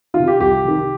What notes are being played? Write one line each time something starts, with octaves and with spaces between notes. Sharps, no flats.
D#3 F4
C3
G4
C2 G4
C3 D#3